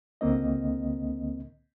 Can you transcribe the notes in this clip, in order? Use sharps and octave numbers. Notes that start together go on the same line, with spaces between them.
C#2 D3 A#3 C4 D#5